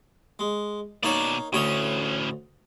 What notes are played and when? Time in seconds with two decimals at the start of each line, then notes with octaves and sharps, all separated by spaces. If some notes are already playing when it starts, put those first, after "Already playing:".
0.39 G#3
1.03 B2 A#3 D#4 C#5 D5
1.53 D2 A2 C#4 C#5 D#5